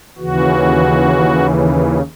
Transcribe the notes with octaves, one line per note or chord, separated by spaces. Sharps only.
D#2 C#3 E3 F#4